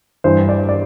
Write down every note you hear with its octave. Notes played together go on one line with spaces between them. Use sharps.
G2 E3 C5
D5
D5